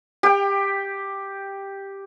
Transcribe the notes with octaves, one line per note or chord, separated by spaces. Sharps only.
G4 G5